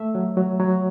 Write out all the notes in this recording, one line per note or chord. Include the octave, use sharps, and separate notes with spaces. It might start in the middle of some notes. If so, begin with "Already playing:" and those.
Already playing: A3 E5
F#3
F#3
F#3